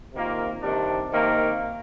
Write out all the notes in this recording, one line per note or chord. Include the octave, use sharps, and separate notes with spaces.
C3 D#3 A#3 F4
C3 D#3 G3 D4
C3 D#3 A#3